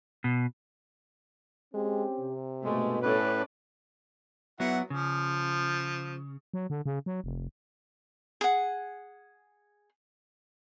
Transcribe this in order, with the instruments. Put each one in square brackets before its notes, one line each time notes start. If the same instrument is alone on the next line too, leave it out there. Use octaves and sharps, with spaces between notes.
[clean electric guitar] B2
[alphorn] G#3 [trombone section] C4 C#4 G4
[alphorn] C3
[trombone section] G2 B2 [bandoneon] G#3 [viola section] A3
[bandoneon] A2 B4 [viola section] C#4 A4 D5
[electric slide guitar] F#3 B3 [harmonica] E4 F#5
[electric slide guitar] C#3 [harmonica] F3
[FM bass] F#3
D3
C#3
F#3
F1
[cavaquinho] G#4 F#5